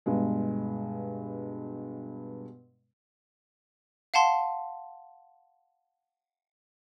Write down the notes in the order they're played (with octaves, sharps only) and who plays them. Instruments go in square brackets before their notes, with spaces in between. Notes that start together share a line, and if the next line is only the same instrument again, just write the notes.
[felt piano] G2 B2 G#3
[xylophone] F5 F#5 A5 C6